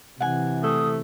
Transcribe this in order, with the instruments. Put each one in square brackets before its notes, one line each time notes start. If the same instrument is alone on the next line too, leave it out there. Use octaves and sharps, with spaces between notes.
[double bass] C3 E3 [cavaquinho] F#5 G#5
[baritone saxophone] A3 [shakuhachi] D#6